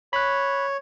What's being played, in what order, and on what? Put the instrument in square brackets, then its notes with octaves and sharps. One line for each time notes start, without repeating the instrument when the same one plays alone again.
[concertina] C#5 [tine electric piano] B5 F#6